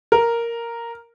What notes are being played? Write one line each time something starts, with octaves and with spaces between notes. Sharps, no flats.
A#4